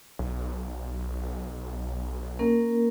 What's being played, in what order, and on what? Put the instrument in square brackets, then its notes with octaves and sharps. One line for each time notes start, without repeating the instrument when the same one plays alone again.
[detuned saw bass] B1
[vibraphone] A#3 C#4 A#4